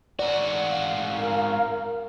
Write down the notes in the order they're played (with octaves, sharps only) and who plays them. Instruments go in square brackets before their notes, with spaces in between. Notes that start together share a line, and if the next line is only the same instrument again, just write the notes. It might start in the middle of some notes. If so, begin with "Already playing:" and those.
[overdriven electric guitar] G#2 F#4 [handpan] D5
[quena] F5
[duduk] A#4